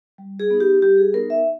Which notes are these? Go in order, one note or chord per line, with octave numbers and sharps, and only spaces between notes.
G3
G#4
B3 D#4
G4
G3 G4
G#4
B3 D#4 A#4
E5